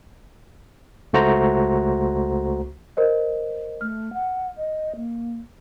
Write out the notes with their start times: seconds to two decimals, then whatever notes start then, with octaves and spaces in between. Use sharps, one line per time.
1.13 C#2 A3 F#4 C5 A#5
2.97 A#4 C5 D#5
3.81 A3 F6
4.13 F#5
4.56 D#5
4.96 A#3